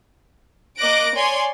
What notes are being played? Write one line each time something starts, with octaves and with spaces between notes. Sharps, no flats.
A#3 D#5 D6 F#6 A#6 D7
C#5 D5 G#5 C6